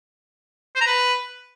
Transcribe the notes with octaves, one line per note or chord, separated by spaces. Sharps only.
C5
A#5
B4